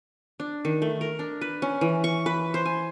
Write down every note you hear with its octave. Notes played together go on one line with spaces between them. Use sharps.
D4
D#3
A3
A#4
D4
B4
C#4
E3
C#6
B4
C5
G#5